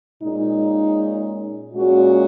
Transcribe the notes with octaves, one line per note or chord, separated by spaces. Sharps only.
A#2 G#3 C#4 D#4
A#2 G#3 C#4 F#4